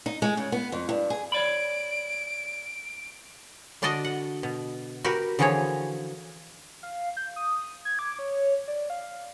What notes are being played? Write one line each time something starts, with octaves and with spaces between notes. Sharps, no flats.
D#4
G#3
C#3
B3
F2
G2
G#4
C#5 D5 B5 D7
D3 D4 F#4 D5 D#5 A5
F#5
B2
F#4 G4 A#4 B4
D3 E3 F3 F#4 G#4 C#5
F5
G6
D#6
G#6
D6
C#5
D5
F5